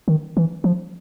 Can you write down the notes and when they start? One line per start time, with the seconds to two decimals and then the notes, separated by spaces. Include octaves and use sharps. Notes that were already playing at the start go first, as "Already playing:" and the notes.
0.08 D#3
0.37 E3
0.64 F3